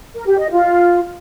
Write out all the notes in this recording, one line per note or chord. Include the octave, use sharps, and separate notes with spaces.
A#4
G4
D#5
F4